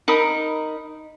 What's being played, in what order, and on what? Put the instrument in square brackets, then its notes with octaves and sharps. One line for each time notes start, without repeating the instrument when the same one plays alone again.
[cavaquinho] D#4 A#4 B5 D#6